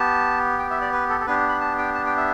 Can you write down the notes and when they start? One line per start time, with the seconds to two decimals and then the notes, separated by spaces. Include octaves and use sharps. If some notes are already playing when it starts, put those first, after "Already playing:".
Already playing: B3 G4 A5
0.59 G5
0.71 E5
0.81 D5
0.93 B4
1.10 A4
1.20 A4
1.27 B3 D4 G4 B4
1.49 B5
1.61 A5
1.78 G5
1.94 A5
2.06 G5
2.17 E5